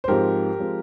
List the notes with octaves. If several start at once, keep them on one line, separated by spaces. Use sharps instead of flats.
C5
G#2 F3 G#3 C4 G4 A#4
F3 G#3 C4